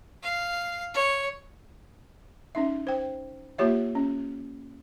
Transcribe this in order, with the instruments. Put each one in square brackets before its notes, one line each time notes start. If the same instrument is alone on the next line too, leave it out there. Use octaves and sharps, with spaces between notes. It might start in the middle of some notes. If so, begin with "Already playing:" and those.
[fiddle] F5
C#5
[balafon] C#4 D#4 E5
C5 G5
A#3 F4 G4 C#5 E5
C#4